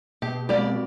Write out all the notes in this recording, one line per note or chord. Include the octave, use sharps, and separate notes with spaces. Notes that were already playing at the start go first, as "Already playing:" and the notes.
B2 A#3 G4
F#3 G#3 C4 G4 D5